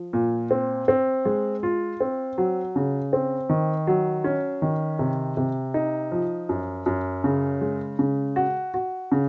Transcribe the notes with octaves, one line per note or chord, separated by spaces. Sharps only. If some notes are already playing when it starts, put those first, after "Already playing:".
Already playing: F3
A#2
C4
C4
G#3
F4
C4
F#3
C#3
C4
D#3
F#3
C#4
D#3
C3
C3
D#4
F3
F#2
F#2
C#3
G#3
C#3
F#4
F#4
C#3